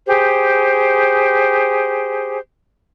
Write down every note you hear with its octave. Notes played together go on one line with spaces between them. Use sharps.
G4 G#4 C5